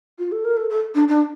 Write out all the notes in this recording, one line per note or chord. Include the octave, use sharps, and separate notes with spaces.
F4
A4
A#4
A4
A4
D4
D4